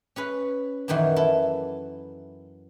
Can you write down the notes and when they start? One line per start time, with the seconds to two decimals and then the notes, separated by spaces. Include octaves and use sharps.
0.16 C#4 G#4 B4
0.88 F#2 A#2 D#3 E3 F#3
1.16 E4 A4